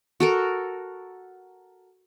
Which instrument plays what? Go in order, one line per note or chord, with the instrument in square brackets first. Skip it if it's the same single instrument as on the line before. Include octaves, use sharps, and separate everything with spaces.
[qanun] F#4 A4 A#4